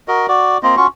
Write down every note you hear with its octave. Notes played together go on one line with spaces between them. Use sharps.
F#4 A#4 D#5
F#4 D5
A#3 C4 F4 D#5
C#4 F4 F#4 C#6